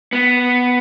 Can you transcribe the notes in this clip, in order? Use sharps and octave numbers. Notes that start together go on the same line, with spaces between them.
B3